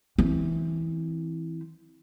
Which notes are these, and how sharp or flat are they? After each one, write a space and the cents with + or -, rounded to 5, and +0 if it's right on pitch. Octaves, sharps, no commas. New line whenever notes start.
E3 -15 C4 +5